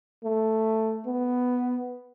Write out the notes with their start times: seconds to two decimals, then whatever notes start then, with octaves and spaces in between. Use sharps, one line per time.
0.24 A3
1.06 B3